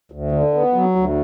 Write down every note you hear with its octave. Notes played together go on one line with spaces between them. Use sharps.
D2
D3
B3
F#3
D2